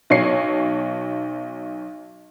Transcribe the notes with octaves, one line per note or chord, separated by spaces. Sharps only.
B1 C#5 C7